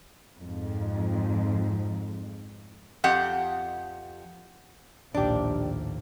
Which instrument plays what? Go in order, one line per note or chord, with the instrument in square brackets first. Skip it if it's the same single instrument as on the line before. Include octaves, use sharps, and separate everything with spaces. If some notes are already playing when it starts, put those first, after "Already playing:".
[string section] F2 G#2
[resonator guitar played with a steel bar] F2 G4 F#5
[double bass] A#1 [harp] D#2 A2 [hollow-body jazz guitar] D4 G4